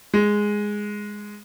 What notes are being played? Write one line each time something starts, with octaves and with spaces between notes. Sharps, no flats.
G#3